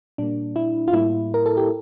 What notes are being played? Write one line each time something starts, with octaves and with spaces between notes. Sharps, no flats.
A#2 G3 A#3 D4
E4
F4
A2 G3 A#3 E4
A#4
A4
G4